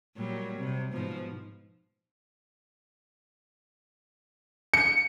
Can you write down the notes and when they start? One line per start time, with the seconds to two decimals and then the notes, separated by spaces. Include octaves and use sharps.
0.16 A#2 F#3 G3
0.58 C3
0.92 G#2 B2 F3
4.74 C#7